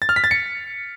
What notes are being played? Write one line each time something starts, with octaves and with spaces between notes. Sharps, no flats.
A6
F6
B6
A6
C#7